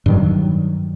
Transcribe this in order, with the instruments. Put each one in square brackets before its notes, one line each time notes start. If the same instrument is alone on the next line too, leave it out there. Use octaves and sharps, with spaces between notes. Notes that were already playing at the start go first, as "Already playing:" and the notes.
[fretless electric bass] G2 D#3 F#3